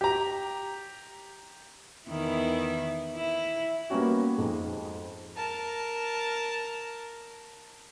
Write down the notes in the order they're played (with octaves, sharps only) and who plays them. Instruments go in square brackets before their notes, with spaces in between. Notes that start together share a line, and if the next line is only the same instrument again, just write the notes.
[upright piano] G4 A#5
[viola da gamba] E2 D#3 E4
E4
[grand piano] G3 A#3 B3 C#4 F#4
F2 G#2 G#3
[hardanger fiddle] A#4 A5